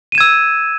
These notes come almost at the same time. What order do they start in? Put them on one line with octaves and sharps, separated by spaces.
D#7 E7 G#6 E6